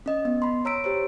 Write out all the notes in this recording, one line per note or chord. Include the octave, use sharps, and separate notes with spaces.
C#4 D#5
B3
B5 C6
C#5 A#5 E6 B6 D7
G4 C5 C#5